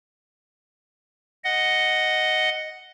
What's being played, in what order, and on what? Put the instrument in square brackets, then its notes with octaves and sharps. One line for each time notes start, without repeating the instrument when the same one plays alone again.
[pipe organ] D#5 F#5